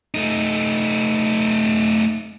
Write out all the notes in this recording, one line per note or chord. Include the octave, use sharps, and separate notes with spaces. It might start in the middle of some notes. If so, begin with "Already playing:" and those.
A3 D#4